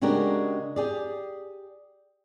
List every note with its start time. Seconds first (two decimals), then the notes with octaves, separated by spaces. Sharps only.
0.02 C#3 G#3 D4 F#4 G4 A#4
0.76 G4 G#4 D5